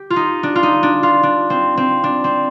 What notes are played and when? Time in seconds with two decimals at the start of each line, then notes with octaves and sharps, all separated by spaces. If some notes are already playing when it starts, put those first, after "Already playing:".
Already playing: G4
0.10 F4
0.16 D#4
0.43 D4
0.55 F4
0.63 D#4
0.83 D4
1.03 F4
1.23 D4
1.50 C4
1.77 C4
2.04 D4
2.24 C4